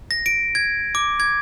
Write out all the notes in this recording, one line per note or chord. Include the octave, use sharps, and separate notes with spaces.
A#6
D7
G#6
D6
G#6